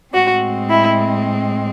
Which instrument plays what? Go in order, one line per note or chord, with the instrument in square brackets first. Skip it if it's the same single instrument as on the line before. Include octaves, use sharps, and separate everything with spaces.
[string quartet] A2 G#3 C4 F#4
E4